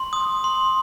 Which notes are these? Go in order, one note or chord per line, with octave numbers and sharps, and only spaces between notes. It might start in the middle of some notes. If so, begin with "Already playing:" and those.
Already playing: C6
D#6
C6